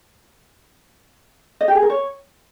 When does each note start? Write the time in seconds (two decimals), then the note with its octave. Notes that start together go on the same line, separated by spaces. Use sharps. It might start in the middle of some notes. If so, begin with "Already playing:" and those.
1.61 D#5
1.68 G4
1.75 G#4
1.82 A#4
1.90 C#5